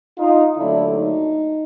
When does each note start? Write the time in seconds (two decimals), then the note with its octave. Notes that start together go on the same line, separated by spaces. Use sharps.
0.18 D#4 F4
0.56 D#2 D3 F#3 A3 D4 E4
0.94 D#4